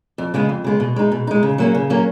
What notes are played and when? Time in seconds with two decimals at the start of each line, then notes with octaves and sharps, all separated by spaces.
0.18 F2
0.34 C#3 G#3 B3
0.49 F2
0.64 C#3 G#3 B3
0.80 B2
0.96 G#3 D#4
1.12 B2
1.27 G#3 D#4
1.43 C#3
1.58 F#3 A#3 C#4
1.74 C#3
1.90 F#3 A#3 C#4